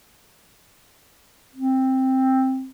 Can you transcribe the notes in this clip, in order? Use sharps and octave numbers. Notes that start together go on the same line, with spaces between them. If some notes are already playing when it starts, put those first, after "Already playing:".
C4